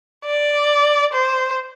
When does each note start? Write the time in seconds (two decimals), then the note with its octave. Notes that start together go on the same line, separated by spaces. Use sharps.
0.25 D5
1.13 C5